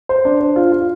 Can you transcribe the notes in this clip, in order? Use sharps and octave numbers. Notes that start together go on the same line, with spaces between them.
C5
D4
C5
F4
F4